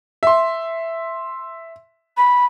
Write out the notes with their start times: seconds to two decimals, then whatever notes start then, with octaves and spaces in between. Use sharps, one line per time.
0.23 E5 C6
2.17 B5